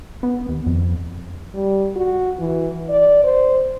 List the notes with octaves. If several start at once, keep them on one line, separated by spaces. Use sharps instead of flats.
B3
D#2
F2
G3
F#4
E3
D5
C5